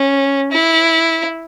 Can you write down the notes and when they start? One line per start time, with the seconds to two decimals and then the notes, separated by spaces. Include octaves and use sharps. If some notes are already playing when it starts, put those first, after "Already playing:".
Already playing: C#4
0.52 E4